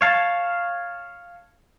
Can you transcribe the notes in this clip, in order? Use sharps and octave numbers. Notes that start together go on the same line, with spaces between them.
C#5 F5 A5